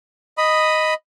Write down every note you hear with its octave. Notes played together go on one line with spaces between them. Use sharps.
D#5 B5 D#6